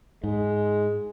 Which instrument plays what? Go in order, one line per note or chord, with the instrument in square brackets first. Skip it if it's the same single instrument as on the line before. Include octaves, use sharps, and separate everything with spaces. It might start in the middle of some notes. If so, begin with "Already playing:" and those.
[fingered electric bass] G#2 [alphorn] G#3